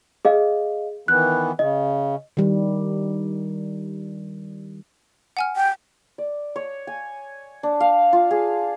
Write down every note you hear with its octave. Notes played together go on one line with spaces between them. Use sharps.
G#4 D#5 F5
D#3 E3 B3 F#6
C#3 D#5
D#3 G3
F#5 G#5 F6
G5
D5
C#5
G#5
D4
F5
F4
G#4